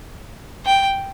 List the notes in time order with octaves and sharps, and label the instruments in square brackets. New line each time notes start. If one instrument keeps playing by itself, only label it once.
[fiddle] G5